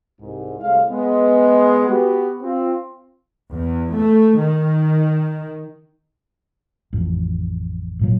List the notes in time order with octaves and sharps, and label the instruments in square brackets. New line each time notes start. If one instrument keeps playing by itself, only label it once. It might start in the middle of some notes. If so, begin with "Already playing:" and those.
[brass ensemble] C2 G#2
C2 A2 G#3 F5
G#3 B3
B3 F#4 G4
C4 F4
[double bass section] E2
A3
D#3
[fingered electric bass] A1 F2
G#1 A#2 F#3